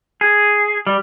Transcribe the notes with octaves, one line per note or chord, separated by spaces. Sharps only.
G#4
G3